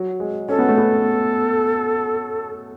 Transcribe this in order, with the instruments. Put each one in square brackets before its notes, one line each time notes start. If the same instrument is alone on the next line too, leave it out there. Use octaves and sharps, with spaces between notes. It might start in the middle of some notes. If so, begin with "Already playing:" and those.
Already playing: [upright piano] F#3
G#3
[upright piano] C#4 [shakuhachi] A4
[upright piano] B3
A3
B3